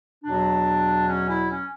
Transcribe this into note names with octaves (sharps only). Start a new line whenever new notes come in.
E2 B2 F#3 D4
C#4
E4
C#4